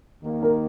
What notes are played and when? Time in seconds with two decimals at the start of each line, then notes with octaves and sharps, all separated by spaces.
0.23 D#2 D#3 A#3
0.42 A#4